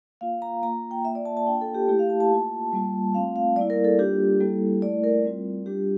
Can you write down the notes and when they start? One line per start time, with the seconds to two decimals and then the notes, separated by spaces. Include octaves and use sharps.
0.21 A#3 F4 F5
0.42 A#5
0.63 A#3 F4 A#5
0.91 G5
1.05 A#3 F4 E5
1.15 D5
1.25 A5
1.37 A5
1.46 A#3 D4 F4 G5
1.61 A4
1.74 G4
1.88 A3 E4 G4
1.99 F5
2.10 A5
2.20 A5
2.31 A#3 F4
2.73 G3 A#3 F4
3.14 A3 C4 F4 F5
3.36 F5
3.56 G3 A#3 E4 D5
3.70 A#4
3.84 A4
3.99 G3 A#3 D4 F4 G4
4.40 G3 A#3 E4 A4
4.82 A3 E4 D5
5.04 A#4
5.25 G3 C4 F4
5.66 G3 D4 F4 G4